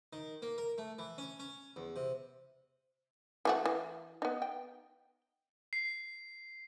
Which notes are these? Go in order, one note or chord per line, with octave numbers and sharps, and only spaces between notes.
D#3
A#3
A#4
A3
E3
C#4
C#4
E2
C3
E3 A3 F#4
E3
B3 D#4
G5
C7